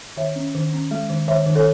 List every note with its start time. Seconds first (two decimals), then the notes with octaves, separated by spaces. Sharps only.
0.17 D#3 C#5 E5
0.36 C#4
0.55 D#3
0.73 C#4
0.91 G#3
1.10 D#3
1.28 D#3 C#5 E5
1.46 D#3
1.55 A4 C#5